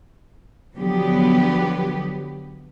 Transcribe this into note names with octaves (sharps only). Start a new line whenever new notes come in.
D3 F3 F#3 B3 G4